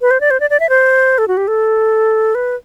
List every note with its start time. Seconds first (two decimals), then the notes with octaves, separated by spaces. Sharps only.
0.01 B4
0.11 C5
0.21 D5
0.31 C5
0.40 D5
0.50 D5
0.60 E5
0.69 C5
1.18 A4
1.28 F#4
1.37 G4
1.48 A4
2.35 B4